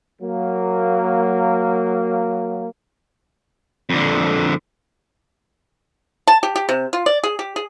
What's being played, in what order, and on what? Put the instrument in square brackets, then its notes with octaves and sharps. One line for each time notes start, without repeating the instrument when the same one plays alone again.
[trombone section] F#3 A#3
[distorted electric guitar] F2 D3
[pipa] A5
G4
G4
C3
F4
D5
G#4
G4
G#4